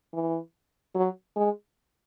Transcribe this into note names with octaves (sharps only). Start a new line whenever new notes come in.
E3
F#3
G#3